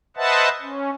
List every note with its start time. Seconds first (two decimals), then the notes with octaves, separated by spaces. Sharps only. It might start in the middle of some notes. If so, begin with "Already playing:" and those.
0.17 B4 C5 D#5 E5 F#5 A5
0.62 C#4